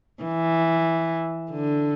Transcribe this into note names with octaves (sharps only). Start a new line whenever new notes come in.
E3
D3